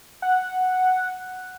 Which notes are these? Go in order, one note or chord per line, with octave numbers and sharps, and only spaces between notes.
F#5